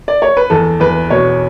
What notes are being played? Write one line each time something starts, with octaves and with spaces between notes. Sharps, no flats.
D5
C#5
B4
E2 A4
E2 B4
B2 C#5